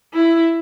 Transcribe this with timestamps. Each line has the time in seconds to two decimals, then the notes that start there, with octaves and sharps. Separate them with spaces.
0.13 E4